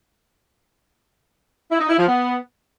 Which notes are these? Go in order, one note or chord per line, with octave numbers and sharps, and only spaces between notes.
E4
D#4
E4
F3
B3